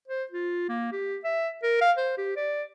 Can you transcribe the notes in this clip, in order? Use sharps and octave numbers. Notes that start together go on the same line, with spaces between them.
C5
F4
A#3
G4
E5
A#4
F5
C5
G4
D5